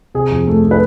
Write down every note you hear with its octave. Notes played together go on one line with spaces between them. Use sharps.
C3 G#4
F2
A3
A3
B4